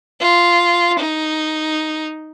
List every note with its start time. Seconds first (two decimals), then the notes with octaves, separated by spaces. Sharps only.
0.20 F4
0.98 D#4